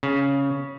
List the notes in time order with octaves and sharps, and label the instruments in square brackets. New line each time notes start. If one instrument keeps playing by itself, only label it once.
[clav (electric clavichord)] C#3